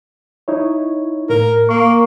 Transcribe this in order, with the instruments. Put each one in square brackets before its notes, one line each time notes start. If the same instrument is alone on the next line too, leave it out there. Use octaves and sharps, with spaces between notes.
[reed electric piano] D#4 E4 C#5
[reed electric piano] A2 [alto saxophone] A#4
[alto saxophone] A#3 [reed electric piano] C#6